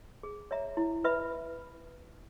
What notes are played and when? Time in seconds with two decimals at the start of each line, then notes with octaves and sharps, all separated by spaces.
0.23 G#4
0.51 C#5 E5 A#5
0.77 E4
1.04 B4 E5 B5